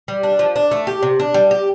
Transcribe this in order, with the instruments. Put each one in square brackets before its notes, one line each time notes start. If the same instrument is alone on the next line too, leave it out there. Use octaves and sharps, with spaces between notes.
[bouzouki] G3
D4
F3
D4
A3
G4
C3
D4
G3
G4